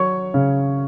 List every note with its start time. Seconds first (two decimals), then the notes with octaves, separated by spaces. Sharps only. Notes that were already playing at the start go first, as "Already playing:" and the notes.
Already playing: F#3 C#5 C#6
0.34 C#3